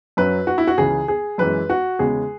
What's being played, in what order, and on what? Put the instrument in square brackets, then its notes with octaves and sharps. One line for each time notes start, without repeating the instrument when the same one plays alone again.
[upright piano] F#2 F#3 B4
F#4
E4
F#4
C#2 C#3 E3 G#4
G#4
F#2 E3 G#3 B4
F#4
E2 C#3 G#3 G#4